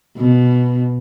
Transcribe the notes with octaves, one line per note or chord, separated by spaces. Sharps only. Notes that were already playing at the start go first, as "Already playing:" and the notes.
B2